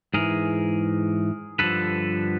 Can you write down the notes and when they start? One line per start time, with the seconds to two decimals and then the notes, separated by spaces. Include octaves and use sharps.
0.14 G#2 E3 G#4 A#4
1.59 G2 D3 F3 A4 B4